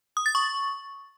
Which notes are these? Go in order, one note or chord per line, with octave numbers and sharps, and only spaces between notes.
D#6
A6
C#6